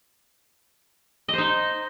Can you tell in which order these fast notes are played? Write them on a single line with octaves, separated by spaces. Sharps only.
D#5 C5 D#4